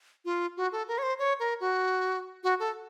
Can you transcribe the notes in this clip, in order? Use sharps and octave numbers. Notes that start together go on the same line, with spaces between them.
F4
F#4
A4
A#4
C#5
C5
C#5
A#4
F#4
F#4
A4